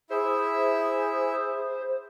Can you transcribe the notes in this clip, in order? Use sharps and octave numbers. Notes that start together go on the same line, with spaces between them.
E4 G#4 C5 E5